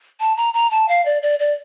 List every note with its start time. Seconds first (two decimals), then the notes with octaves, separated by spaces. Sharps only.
0.20 A5
0.37 A#5
0.54 A#5
0.71 A5
0.89 F5
1.06 D5
1.22 D5
1.40 D5